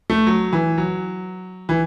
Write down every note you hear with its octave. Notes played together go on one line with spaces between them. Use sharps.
A3
F#3
E3
F#3
E3